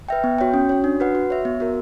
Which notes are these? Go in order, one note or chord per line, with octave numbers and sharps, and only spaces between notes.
B4 E5 G5
B3
F#4 C#5 G5
C#4
F#4 C#5
D4
F#4 B4 F#5
F#4
C#5 E5
B3
F#4 A#4